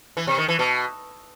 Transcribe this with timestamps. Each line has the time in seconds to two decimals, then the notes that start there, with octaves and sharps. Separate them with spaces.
0.17 E3
0.27 C3
0.38 D#3
0.48 E3
0.59 B2